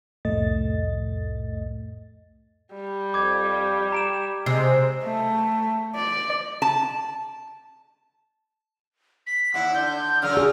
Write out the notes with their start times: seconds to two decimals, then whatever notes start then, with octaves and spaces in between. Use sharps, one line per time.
0.25 C2 F2 A2 A3 D#5 A6
2.74 G3
3.14 F2 D6 G#6
3.92 G4 A#5 D7 E7
4.46 C3 G#3 E6 C7
5.04 A3
5.96 D5
6.62 A5
9.27 B6
9.54 D#2 E4 F#5
9.74 D3 G6
10.22 C#3 F#3 A#4 F6
10.37 G#4